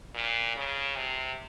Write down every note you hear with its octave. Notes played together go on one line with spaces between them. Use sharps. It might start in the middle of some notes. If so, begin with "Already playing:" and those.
A#2
C#3
C3